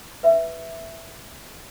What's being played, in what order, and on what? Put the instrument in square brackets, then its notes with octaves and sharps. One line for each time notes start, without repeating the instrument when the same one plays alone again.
[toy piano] B4 E5